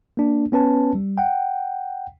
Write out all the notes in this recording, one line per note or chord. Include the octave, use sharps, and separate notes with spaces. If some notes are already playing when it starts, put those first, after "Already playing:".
A#3 D4
B3 C#4 B4 A5
G3
F#5 G5